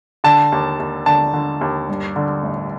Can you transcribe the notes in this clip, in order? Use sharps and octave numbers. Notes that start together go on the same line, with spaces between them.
D3 A5
D#2
D#2
D3 A5
D3
D#2
G2
D3
A1